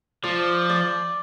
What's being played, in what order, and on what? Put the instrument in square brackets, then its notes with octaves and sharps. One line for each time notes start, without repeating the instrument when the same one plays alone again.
[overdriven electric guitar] F3 [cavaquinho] D5
[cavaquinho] D5